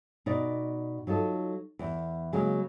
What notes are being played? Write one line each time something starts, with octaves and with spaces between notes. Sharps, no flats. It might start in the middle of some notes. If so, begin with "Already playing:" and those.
B2 D#4 D5
F#3 D#4 F4 A4
E2
C#3 F#3 G#3 A#3